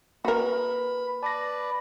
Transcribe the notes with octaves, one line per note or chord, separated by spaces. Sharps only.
A#3 F#4 A#4 B4 B5
B4 D5 A5 A#6